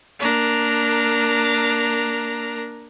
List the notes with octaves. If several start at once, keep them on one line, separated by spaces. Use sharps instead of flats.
A#3 D4 A#4 A#5